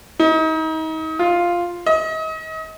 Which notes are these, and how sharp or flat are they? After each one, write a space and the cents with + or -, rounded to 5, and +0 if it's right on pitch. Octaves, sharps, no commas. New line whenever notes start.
D#4 +35
F4 +0
D#5 +35